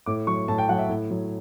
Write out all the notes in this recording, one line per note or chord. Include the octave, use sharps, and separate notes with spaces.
A2 D6
F#3 C#6
A2 A5
G5
F#3 F#5
E5
A2
F#3